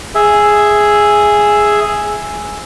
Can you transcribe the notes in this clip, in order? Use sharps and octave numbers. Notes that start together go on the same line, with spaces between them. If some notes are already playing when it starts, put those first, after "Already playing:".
G#4 E5